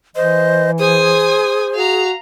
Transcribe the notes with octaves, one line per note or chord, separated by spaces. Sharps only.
E3 C5 D#5
G#4 C5 G#5 D#6
F#4 F5 A#5